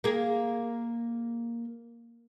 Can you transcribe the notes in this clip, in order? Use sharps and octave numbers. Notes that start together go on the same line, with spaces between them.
A#3 G#4